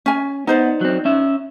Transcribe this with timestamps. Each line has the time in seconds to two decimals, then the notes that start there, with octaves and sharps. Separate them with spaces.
0.06 C#4 G#5
0.47 B3 D#4 C5 D5
0.81 F#3 C4
1.05 C#4 E5